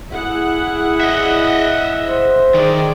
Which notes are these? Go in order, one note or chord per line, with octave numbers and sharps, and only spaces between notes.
E4 G#4 F#5
D#5 E5
C5
D#3 G#4 D5